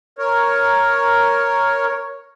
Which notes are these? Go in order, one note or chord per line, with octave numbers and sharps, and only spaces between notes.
A#4 C#5